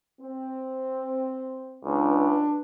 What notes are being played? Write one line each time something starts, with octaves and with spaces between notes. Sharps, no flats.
C4
C#2 D4 B4